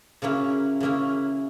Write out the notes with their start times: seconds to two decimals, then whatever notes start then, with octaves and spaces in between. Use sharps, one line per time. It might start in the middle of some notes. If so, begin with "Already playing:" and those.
0.22 C#3 F#3 A#3 C#4 E4
0.80 C#3 F#3 A#3 C#4 E4